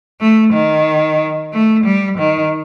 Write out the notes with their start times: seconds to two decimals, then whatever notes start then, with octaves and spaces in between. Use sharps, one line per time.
0.20 A3
0.53 D#3
1.53 A3
1.85 G3
2.18 D#3